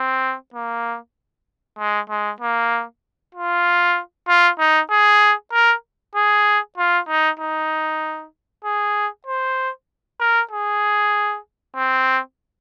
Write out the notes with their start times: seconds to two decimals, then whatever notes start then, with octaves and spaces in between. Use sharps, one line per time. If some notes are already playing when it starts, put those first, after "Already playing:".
Already playing: C4
0.54 A#3
1.79 G#3
2.10 G#3
2.40 A#3
3.35 F4
4.28 F4
4.59 D#4
4.90 G#4
5.53 A#4
6.15 G#4
6.78 F4
7.08 D#4
7.39 D#4
8.64 G#4
9.27 C5
10.20 A#4
10.51 G#4
11.76 C4